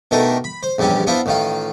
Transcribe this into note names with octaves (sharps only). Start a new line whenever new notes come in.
B2 D#3 A3 D4 A#4
B5
C5
A#1 E2 G3 C#4 G4
B3 D4 E4 F4 C5
A1 D#3 F4